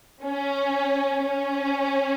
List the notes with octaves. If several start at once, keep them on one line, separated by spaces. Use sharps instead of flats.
C#4
C#4